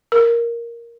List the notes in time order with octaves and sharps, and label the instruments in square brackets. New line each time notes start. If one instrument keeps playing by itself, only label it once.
[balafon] A#4